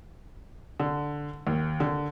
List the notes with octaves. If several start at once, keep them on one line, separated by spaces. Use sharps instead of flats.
D3
D#2
D3